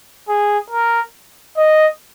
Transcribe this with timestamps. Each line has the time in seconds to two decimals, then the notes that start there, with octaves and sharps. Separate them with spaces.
0.28 G#4
0.70 A#4
1.57 D#5